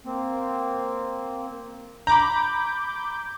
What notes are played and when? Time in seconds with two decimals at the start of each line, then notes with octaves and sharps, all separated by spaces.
0.06 A#3 C4
2.07 A#5 B5 D6 G6